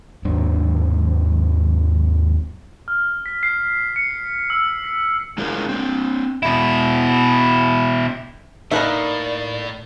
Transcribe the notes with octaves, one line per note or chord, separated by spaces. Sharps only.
D#2 G#2 F#3 D4
F6
B6
C7
C#7
C7
E6
B6
G#3 D4 E4 F4 G#4 A#4
C4 D4
B2 E4
A2 A#3 D#4 A#4 B4 D5 E5